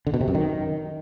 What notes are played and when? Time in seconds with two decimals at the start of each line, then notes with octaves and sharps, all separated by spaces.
0.07 D3
0.14 B2
0.21 C3
0.28 F#2
0.35 D#3